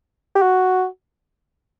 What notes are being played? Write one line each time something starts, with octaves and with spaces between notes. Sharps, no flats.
G4
F#4